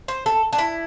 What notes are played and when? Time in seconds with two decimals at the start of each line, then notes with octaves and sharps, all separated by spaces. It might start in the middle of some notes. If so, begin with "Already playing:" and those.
0.08 C5
0.26 A4
0.53 D4
0.58 E4